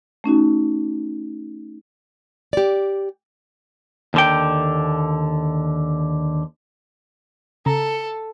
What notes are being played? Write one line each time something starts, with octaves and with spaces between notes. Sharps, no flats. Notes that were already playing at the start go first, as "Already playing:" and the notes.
A3 C#4 D#4 F#4
G4 D5
D#2 D3 G5
C#3 A4 A#5